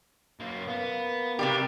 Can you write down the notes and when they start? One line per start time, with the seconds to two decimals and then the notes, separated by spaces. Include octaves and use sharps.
0.40 F#2 A#3
0.68 A#3 B3
1.39 C3 G3 G4 A#4